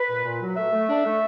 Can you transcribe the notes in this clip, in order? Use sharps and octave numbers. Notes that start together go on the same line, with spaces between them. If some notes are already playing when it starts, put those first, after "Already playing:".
Already playing: B4
A#2
A#2
F#3
A3 E5
A3
D4
A3